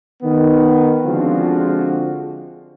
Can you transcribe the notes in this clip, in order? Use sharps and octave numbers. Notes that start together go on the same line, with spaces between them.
D#3 B3
D3 F3 G#3 C4 F4 F#4